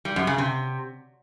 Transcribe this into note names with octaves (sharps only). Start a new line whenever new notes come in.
G3
F#2
C#3
C3